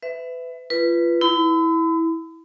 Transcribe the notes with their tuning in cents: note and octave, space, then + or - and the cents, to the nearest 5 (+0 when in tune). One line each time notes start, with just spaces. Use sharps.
B4 +30 E5 +0
F4 -30 B4 +0
E4 -15 B5 +40